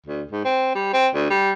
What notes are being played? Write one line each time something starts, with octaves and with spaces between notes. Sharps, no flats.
D2
G#2
C4
G3
C4
D2
G3